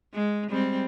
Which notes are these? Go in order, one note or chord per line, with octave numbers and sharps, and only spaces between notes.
G#3
G3 G#3 C4